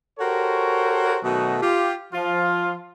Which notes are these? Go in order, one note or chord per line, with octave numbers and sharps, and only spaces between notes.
F#4 G4 A4 A#4 C5 C#5
B2 D#3 F#3 A3 D#4 F#4
F4 G4
F3 F4